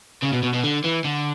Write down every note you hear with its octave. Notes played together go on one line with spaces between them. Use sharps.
C#3
B2
B2
B2
D3
E3
D3